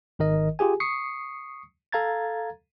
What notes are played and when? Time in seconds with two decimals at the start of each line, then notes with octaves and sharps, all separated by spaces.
0.19 G#1 D#3 A#4 D#5
0.59 F4 G4 G#4 G#5
0.80 C#6 D#6 C7 C#7
1.92 A4 F5 A#5 G#6 A6